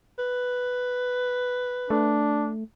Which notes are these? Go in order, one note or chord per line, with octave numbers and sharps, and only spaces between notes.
B4
A3 D4